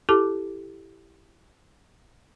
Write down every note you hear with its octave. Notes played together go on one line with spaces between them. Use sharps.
E4 G4 A4 A5 D6